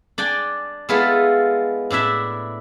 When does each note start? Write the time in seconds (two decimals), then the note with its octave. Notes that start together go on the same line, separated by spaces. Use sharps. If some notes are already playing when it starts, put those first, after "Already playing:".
0.18 D4 D5 G5 G#5
0.89 G#3 B3 E4 F4 A4
1.90 A2 D4 E4 E5